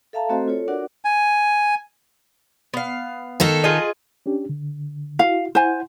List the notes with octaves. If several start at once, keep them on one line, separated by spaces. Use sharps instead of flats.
A4 E5 F5 A5 A#5
A3 C4 F#4 A4 C5 D#5
F4 A4 C#5
D4 F#4 A#4 D5 F#5
G#5
B3 F5
D#3 D#4 A4
F4 G#4 D#5
C#4 D4 G4
D3
E4 F#4 F5
E4 C5 F#5 G#5